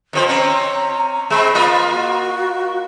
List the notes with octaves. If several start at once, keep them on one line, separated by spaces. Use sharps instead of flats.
F2 F3 C5
C4 C#4 A#5
G#3 C4 B5
A#3 F4 D#5
F#4